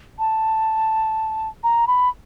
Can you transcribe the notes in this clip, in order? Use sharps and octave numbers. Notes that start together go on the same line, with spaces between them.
A5
A#5
B5